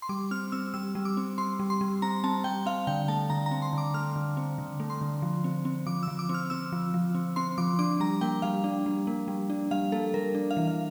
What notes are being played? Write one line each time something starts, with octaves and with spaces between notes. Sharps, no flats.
C6
G3 D6
C4 F6
C4 E6
G3 E6
G3
D6
C4
C4 C6
G3
C6
G3
C4 A#5
C4 A5
G3 G5
C4 F5
D3 G5
A3 A5
D3 A#5
A#5
C4
C6
D3 D6
A3 F6
D3
C4
D3
A3
C6
D3
F3
C4
C4
F3 D6
F3 E6
D6
C4
F6
C4 E6
F3
F3
C4
C4 C6
F3 D6
D4 D6
G3 A#5
A#3 G5
G3 F5
D4
G3
A#3
G3
D4
G3 F5
A#3 A4
G3 A#4
D4
F5
E3
F5